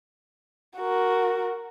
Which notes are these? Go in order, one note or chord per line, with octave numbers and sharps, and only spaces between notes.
F#4 A#4